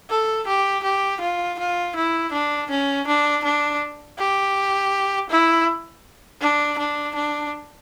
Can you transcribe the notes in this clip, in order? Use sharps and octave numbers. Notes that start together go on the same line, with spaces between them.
A4
G4
G4
F4
F4
E4
D4
C#4
D4
D4
G4
E4
D4
D4
D4